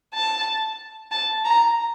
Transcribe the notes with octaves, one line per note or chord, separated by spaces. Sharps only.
A5
A5
A#5